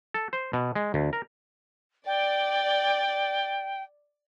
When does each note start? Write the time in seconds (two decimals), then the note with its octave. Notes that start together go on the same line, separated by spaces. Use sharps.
0.14 A4
0.33 C5
0.53 B2
0.75 G#3
0.94 D2
1.13 A#4
2.06 D5 G5